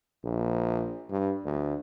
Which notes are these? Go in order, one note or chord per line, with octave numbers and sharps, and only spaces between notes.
A#1
G2
D2